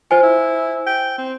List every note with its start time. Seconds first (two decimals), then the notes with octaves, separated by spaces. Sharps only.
0.11 F4 C5 G#5
0.23 E4
0.86 G5
1.18 C4